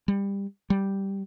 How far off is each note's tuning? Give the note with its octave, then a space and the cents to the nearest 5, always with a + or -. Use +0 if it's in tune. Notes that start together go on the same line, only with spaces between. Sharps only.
G3 +20
G3 -5